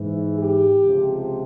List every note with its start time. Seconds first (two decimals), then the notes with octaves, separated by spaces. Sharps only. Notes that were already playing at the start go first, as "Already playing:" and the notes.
Already playing: G#2 E3
0.37 G4
0.84 C#2 C3 F3